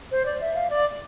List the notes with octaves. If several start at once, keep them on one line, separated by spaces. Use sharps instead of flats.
C5
D5
E5
F5
D5